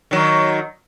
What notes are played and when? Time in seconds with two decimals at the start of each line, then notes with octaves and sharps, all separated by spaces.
0.11 D#3 F#3